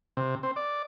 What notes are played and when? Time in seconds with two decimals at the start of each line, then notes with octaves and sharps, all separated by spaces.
0.17 C3
0.43 C4
0.56 D5